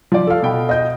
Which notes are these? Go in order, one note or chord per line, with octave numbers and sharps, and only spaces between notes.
F3 D5
A4 F5
B2 G5 B5
D#5 G6